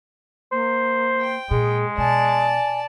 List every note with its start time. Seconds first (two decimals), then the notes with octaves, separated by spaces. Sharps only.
0.52 A#3 C5
1.20 G5
1.51 A#2 G#3 G#4
1.98 B2 D5 G#5 A5